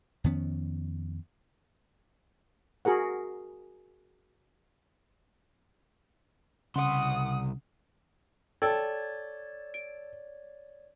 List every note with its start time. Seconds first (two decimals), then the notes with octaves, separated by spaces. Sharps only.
0.24 F2 D#3 B3 C#4
2.85 F#4 G#4 A#4 F#5
6.76 C2 C#3 F#5 C6 D#6
8.62 A4 C#5 D5 G5 A5
9.74 D7